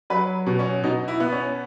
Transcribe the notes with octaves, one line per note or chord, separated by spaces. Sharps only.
F#3 B4
B2
C#4
B2 D#4
E4
B3
C#4